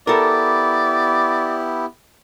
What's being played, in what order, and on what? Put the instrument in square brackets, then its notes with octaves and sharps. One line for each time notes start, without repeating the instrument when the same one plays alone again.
[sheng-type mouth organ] B3 E4 G4 [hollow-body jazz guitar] A4 A#4 [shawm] D5